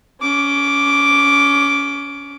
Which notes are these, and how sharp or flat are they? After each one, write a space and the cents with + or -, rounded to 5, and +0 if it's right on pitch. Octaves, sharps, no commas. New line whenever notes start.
C#4 +20 D6 +0